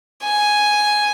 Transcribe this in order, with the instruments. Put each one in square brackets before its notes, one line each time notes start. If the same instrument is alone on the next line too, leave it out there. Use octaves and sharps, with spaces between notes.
[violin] G#5